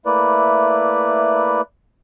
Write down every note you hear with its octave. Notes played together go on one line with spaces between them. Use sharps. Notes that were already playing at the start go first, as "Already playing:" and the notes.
A3 A#3 E4 B4 D5